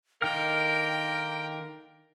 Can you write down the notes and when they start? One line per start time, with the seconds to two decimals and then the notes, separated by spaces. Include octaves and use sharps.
0.22 D3 D#3 A#3 A#4 G5 F6